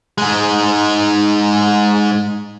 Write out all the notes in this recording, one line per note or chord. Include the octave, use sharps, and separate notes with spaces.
G#2 G#3